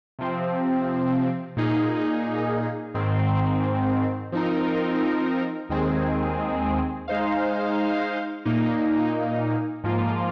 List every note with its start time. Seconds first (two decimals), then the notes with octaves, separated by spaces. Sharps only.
0.19 C3 F3 C4
1.56 A#2 A#3 D#4 G#4
2.94 G#2 D#3 C4
4.32 F3 C4 D#4 A#4
5.69 D#2 D#3 G#3 C4 G#4
7.08 G#3 D#4 C5 F5
8.45 A#2 A#3 D#4
9.84 G#2 F3 A#3 F4